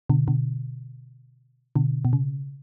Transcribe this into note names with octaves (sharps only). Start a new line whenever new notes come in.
B2 D3
B2 D3
B2 D3
B2
C#3